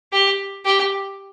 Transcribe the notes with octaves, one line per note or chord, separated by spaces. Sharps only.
G4
G4